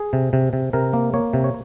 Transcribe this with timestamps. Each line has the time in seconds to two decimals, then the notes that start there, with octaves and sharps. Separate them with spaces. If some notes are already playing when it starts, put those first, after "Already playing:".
Already playing: G#4
0.13 C3
0.33 C3
0.53 C3
0.73 C3 A#4
0.93 A#3
1.14 A#3 C#5
1.33 C3
1.44 C#5